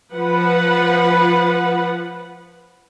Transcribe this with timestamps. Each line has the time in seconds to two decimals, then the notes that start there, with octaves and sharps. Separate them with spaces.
0.14 F3 B4 F#5